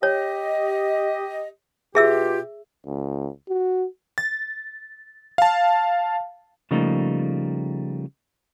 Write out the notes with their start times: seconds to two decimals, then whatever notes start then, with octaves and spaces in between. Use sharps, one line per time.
0.03 G4 C#5 D#5
1.95 B2 F4 G4 G#4 E5 E6
2.87 C#2
3.49 F#4
4.18 A6
5.38 F5 A5
6.71 C#3 F3 G3 A3 A#3 D#4